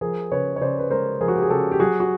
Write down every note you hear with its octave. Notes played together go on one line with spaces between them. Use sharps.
F3 G#4 A#4
C#3 B4 C#5
C#5
C#3 C5 D5
B4
G#3 A#4 C5
F3 G#4 A#4
F#4
G4
G#4
C#3 G4 A4
G4
F#3 F#4 G#4
F#4